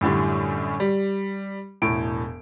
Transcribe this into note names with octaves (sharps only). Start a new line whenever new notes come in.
F#2 A2 D3 G3
G3
E1 A2 D7